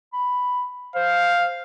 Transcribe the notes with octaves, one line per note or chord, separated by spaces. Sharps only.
B5
C5 F5